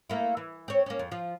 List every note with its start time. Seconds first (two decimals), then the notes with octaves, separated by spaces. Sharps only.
0.10 A3 A#3 E4
0.37 E3
0.68 C4 C#5
0.86 A#3 C#4
0.99 F2
1.11 F3 F4